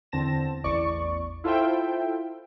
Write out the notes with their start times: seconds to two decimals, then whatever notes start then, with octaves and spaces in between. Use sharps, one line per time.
0.12 E2 D3 C4 A5 A#6 E7
0.64 A1 E2 D5 C#6
1.44 E4 F4 A4 C5 E5 G5